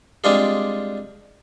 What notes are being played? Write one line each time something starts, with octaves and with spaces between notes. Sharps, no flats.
G3 G#3 C4 D4 F4 G#4